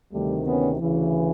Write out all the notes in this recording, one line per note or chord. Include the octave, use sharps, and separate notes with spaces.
D2 C3 D#3 G3 A3
B3 C#4
D2 C#3 E3